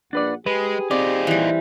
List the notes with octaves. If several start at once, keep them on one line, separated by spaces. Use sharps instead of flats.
A#1 D4 B4 D5 F#5
G#3 G4 G#4 B4
C4 D#4 F4 D5
E3 G3